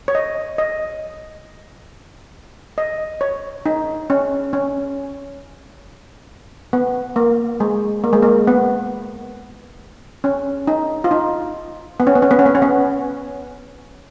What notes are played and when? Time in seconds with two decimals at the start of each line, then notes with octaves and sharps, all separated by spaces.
0.08 C#5
0.15 D#5
0.58 D#5
2.78 D#5
3.21 C#5
3.66 D#4
4.10 C#4
4.53 C#4
6.73 B3
7.16 A#3
7.60 G#3
8.04 A#3
8.13 G#3
8.23 A#3
8.47 B3
10.24 C#4
10.67 D#4
11.04 F4
11.11 D#4
12.00 B3
12.07 C#4
12.15 B3
12.22 C#4
12.31 B3
12.39 C#4
12.46 B3
12.55 C#4
12.62 B3